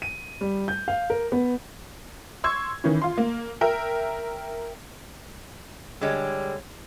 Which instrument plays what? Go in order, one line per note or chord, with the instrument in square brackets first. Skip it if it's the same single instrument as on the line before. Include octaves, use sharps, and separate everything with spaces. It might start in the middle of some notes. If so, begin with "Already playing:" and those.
[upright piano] D#7
G3
G6
F5
A#4
B3
[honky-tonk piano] C6 C#6 E6 G#6
D#3 E3 C#4
F4 C6
A#3
A#4 E5 G5
[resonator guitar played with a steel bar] D3 G#3 [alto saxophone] G3 [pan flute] C#5